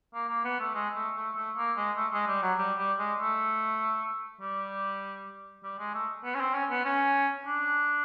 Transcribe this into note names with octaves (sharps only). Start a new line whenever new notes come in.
A#3
A#3
B3
A3
G#3
A3
A3
A3
A#3
G#3
A3
G#3
G3
F#3
G3
G3
G#3
A3
G3
G3
G#3
A3
B3
C#4
C4
C#4
B3
C#4
D4